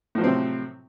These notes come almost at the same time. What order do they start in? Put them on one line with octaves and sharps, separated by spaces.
A2 F3 F#3 C4 C3